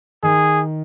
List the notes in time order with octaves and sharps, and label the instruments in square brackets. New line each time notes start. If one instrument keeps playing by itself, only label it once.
[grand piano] D#3 [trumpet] G#4